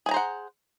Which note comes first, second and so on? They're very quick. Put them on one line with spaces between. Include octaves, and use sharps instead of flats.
G#4 G#5 A#5 C5 F#5